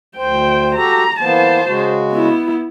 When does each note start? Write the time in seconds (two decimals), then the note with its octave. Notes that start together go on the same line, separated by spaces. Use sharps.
0.17 D2 C5 G5
0.75 F#4 G4 A4 A#5
1.20 E3 A#3 B3 C5 A5
1.66 C#3 G#3 F#4
2.12 B3 E4